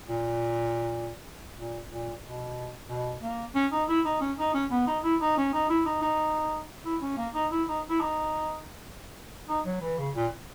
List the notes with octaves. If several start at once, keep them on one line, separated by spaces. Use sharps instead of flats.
A#2
A#2
A#2
B2
B2
A#3
C#4
D#4
E4
D#4
C#4
D#4
C#4
B3
D#4
E4
D#4
C#4
D#4
E4
D#4
D#4
E4
C#4
A#3
D#4
E4
D#4
E4
D#4
D#4
F#3
E3
C#3
A#2